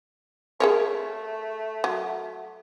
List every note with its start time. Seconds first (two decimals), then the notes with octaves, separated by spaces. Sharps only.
0.60 A3 G#4 A#4 C#5
1.84 F#3